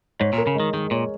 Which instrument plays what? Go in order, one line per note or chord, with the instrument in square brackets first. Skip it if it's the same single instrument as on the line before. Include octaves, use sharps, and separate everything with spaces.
[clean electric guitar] G#2 [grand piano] C#5
[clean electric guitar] A#2
[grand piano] A#4
[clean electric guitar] C#3
[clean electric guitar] D#3 [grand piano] G#3
[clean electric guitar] D#3 [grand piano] G#3
[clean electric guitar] A#2 [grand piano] C#5